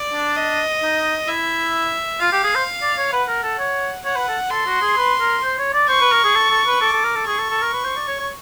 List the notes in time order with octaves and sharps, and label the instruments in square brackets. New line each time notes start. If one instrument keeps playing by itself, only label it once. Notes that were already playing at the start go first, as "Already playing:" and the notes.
Already playing: [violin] D5
[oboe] D4
[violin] D#5
[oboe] D#4
[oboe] E4 [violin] E5
[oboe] F4 [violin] F5
[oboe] G4
G#4
C5
D5
C#5
[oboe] B4 [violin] F#5
[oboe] A#4
A4
C#5
[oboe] C#5 [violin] F#5
[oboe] B4
A4
[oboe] A4 [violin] C6
[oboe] F#4
G#4
B4
A#4
C5
C#5
D5
[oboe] C5 [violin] C#6
[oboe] B4
A#4
G#4
A4
A4
B4
[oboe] A4 [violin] D6
[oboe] A4
A#4
A4
[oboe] G#4 [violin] C#6
[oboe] A4
A4
A#4
B4
C5
D5
C#5
C#5